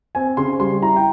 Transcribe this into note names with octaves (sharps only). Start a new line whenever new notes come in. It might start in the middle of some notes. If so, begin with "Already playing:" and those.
C4 G#5
C#3 C6
G3 C6
E4 A#5
G5